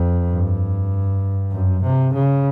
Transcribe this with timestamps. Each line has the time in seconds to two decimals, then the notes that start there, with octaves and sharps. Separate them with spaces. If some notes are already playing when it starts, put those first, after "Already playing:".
Already playing: F2
0.29 G2
1.52 F#2
1.82 C3
2.13 C#3